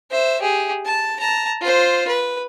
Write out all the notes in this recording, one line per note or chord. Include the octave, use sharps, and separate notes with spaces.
C5 E5
G4 G#4
A5
A5 A#5
F4 C5
B4